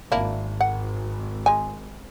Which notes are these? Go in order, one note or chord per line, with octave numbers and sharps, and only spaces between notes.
G#1 A#3 D4 E4
F#5
G#3 G#5